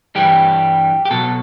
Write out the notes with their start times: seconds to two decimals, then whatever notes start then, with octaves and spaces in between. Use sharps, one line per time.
0.15 G2 E3 G3 G4
1.05 G4
1.11 B2 F#3 A4